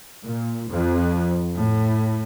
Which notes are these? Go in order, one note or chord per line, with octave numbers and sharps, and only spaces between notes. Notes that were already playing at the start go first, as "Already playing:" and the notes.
A#2
F2
A2